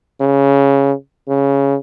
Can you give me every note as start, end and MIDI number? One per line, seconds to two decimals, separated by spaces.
0.20 0.92 49
1.28 1.76 49